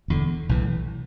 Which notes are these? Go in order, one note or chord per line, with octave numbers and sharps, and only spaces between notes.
E1 E2 D3
B1 A2 E3